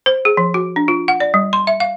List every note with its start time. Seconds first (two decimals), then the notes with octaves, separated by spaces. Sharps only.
0.06 C5
0.25 G#4
0.37 F3
0.54 F#4
0.76 D4
0.88 F4
1.08 F#5
1.20 D5
1.34 G3
1.53 C6
1.67 E5
1.80 F5